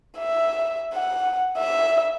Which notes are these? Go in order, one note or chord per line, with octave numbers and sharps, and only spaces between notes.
E5
F#5
E5